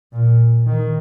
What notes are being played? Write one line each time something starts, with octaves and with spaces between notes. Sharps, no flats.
A#2
D#3